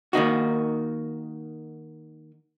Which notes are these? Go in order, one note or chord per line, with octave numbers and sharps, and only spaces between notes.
D#3 A#3 D#4 F#4